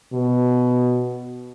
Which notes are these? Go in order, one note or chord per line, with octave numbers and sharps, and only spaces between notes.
B2